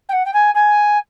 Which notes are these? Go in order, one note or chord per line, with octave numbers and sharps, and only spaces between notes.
G5
F#5
G5
G#5
G#5